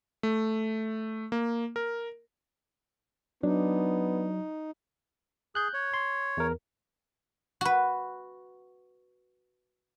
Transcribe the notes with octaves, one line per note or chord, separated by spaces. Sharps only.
A3
A#3
A#4
F#3 B3 D4 D#4
G#4 F#6 G6
C#5
C6
E2 A#4
F#4 B4